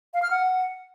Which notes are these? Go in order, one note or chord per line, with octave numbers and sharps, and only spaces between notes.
F5
F6
F#5